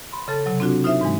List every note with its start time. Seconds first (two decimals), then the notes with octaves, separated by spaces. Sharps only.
0.13 B5 C6
0.28 C#3 A4 A5 A6
0.46 C3 F#3
0.60 C4 D4 F4 F#4
0.84 D#4 F4 C5 E5
1.01 G#2 E3 G#3